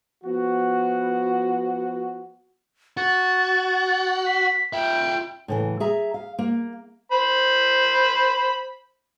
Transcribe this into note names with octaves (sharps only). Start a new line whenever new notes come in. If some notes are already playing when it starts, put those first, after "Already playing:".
F3 B3 F#4
F#4 A6
B6
F4 E5 G5
A2 C#3 E3
G#4 E5 A#5
F5
A#3
C5 B5